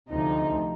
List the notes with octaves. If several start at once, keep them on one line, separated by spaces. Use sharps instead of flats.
D2 C3 F3 D#4